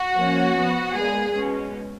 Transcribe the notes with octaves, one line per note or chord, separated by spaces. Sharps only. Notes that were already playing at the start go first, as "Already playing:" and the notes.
Already playing: F#4
F3 A#3 C#4
F3 B3
A#2 G#3 B3 G#4
B2 G#3 C#4